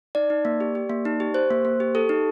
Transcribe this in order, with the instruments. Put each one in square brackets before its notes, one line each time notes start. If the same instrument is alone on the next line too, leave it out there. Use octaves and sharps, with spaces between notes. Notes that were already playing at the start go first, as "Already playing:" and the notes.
[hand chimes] D#4 D5
D#4
A#3
G4
G4
A#3
D#4
G4
G4 C5
A#3
A#3
G4
G4 A4
D#4